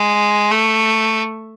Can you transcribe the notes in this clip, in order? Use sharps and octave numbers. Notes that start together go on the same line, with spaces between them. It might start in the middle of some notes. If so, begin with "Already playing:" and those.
Already playing: G#3
A3